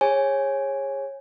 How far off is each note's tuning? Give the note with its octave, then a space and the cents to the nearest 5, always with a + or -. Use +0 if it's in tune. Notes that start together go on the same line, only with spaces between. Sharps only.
G#4 -30 C#5 -20 G#5 +0